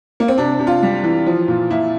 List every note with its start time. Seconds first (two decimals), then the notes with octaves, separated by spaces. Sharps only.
0.20 A#3
0.28 C4
0.38 C3 D4
0.60 C3
0.67 F4
0.83 G3
1.04 E3
1.26 F3
1.48 A#2
1.71 A#2 E4